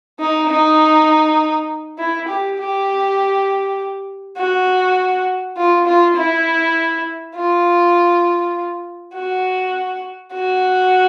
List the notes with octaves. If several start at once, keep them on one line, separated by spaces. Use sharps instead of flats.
D#4
D#4
E4
G4
G4
F#4
F4
F4
E4
F4
F#4
F#4